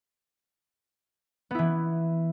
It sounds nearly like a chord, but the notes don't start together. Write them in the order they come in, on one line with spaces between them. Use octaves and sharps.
B3 E4 E3